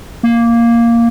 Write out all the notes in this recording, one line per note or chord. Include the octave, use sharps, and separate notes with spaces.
A#3